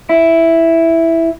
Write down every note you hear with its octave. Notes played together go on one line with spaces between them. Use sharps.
E4